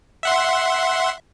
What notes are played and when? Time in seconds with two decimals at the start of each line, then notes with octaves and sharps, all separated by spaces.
0.23 E5 F#5 C6